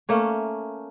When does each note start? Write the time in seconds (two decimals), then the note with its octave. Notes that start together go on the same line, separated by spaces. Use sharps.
0.09 A3 A#3 C#4